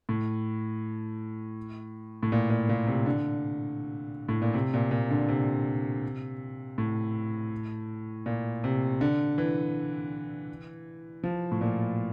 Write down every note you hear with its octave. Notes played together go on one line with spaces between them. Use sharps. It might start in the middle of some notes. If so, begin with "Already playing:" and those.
A2
A2
A#2
A#2
A#2
C3
D3
A2
A#2
C3
A#2
A#2
D3
C3
A2
A#2
C3
D3
E3
F3
A2
A#2